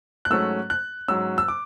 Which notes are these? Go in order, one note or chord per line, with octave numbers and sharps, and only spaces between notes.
F#6
G#2 F#3 A3 C#4 E6
F#6
G#2 F#3 C#4 E6
E6
D6